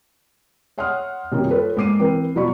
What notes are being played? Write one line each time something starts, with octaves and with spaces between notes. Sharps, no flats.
C#5 E5 F#5 C6 D#6 F6
F#2 D#3 G3 A#3 C4 F4
F4 A4 B4 C#5
G#2 A#3 D6 C7 D#7
E3 C4 A#4 B4
B2 F#3 F4 D5 B5 C#6